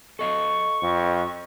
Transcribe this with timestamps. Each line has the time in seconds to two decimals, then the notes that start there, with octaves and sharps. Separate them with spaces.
0.19 A4 D#5 F5 C#6
0.83 F2